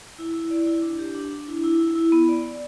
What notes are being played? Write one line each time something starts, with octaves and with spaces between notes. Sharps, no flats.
E4
E4
D5
E4
D4
G4
D4
D4
E4
E4
E4
E4
B3
D5
D5